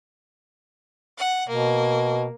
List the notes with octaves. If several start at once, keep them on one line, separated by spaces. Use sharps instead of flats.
F#5
B2 A#3